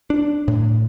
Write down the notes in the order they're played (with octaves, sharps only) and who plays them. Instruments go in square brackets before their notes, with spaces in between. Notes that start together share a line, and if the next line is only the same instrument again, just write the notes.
[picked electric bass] D4
A2